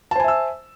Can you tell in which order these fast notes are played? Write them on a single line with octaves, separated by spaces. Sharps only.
A5 C5 G#5 E5 E6